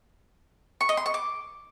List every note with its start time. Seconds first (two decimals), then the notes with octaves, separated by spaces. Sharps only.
0.81 C#6
0.89 D#5
0.97 C6
1.06 C#6
1.14 D6